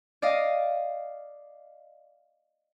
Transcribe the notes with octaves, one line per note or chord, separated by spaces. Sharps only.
D5 D#5 F5